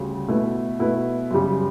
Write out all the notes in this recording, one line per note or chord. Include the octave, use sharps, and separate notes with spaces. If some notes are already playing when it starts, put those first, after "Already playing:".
Already playing: D2 C#3 G3
B2 A3 E4 B4
B2 A3 E4 B4
F#2 C#3 G3